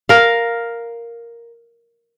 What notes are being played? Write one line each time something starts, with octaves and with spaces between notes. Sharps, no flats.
A#4 F5